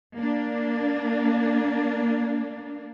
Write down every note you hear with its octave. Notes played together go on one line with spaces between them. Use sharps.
A#3 D4